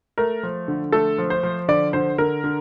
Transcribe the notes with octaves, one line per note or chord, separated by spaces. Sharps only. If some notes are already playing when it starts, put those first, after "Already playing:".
A3 A#4
F3
D3
A3 A4
F3
C5
F3
D3 D5
D3 C5
D3 A#4
D3